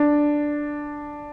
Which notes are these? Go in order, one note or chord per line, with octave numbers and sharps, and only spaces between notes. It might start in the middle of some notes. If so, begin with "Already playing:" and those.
Already playing: D4